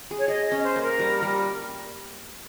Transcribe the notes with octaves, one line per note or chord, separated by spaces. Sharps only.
G#4
C#5
G#4 D#5
D#5
C#4
C5
A#3
A#4
G3
G3